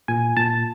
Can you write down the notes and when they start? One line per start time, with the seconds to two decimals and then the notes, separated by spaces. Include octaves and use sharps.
0.08 A#2 G#5
0.37 A#2 A5